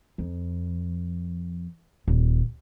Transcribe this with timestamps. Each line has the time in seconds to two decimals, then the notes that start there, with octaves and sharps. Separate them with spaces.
0.18 F2
2.08 D#1